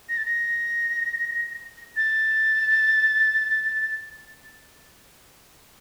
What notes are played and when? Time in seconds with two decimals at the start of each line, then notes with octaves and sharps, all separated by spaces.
0.09 A#6
0.17 A6
0.25 A#6
1.96 A6